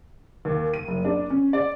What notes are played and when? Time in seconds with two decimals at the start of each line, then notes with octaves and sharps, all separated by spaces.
0.45 D#2
0.74 D#7
0.88 F#1
1.05 D4
1.30 C#4
1.53 D5